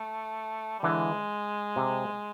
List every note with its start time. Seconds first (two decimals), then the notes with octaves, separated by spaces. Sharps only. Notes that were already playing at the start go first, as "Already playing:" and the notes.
Already playing: A3
0.79 G3
0.83 D3 E3 G#3
1.76 C3